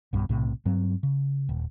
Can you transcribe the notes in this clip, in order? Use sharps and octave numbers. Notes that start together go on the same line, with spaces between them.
B1 G2 B2
B1 A2 C3
G2 F#3 C4
C#3
D#1